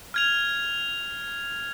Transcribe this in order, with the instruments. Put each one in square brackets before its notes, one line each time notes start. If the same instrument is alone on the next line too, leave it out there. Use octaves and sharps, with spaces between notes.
[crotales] F6 G#6 F7